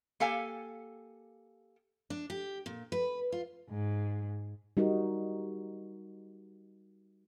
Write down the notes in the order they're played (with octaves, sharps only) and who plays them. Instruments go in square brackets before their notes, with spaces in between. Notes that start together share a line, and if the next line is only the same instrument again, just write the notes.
[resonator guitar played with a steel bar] A#3 G4 A4 F5 G#5
[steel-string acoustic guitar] D4
G4
A#2
B4
F4
[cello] G#2
[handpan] G3 D#4 F#4 A#4